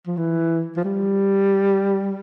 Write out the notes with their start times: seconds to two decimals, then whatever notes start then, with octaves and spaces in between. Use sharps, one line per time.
0.07 F3
0.17 E3
0.77 F3
0.84 G3